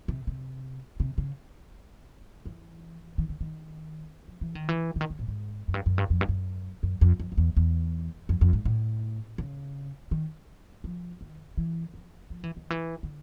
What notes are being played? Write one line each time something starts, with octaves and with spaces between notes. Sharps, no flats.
C3
C3
C3
C#3
E3
D#3
D3
D#3
F3
E3
D#3
E3
D3
D#3
D3
A2
G#2
F#2
G2
F#2
G2
F2
G2
F#2
F#2
F2
F2
F2
E2
E2
F2
F2
G#2
A2
C#3
D#3
F3
D#3
E3
F3
F3
E3
D#3
E3
D3